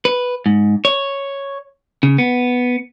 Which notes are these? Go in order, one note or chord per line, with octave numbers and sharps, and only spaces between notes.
B4
G#2
C#5
C#3
B3